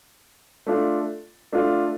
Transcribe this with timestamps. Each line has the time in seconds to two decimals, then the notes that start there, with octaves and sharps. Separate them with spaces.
0.67 A3 D4 F4
1.52 A3 D4 F4